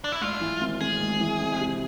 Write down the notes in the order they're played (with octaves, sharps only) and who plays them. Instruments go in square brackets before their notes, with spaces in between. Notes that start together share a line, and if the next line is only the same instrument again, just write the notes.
[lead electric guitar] D4
E4
[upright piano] G#2 [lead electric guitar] F4
[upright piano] E3
G#1
[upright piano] G#1 [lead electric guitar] G#4
[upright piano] G#2
E3
F2
C3